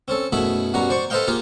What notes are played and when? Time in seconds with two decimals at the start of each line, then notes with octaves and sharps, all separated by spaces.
0.08 C4 C#4 A4
0.32 F#2 B2 A3 E4 G#4 B5
0.74 B1 F#2 B2 G3 F#4 A#5
0.90 C5 D5 C#6
1.10 A4 B4 C5 D#5 F5 G5
1.28 A#3 F4 G4 G#4